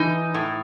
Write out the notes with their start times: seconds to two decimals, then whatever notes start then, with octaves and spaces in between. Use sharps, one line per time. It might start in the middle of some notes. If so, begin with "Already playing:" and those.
Already playing: E3 D#4
0.34 A2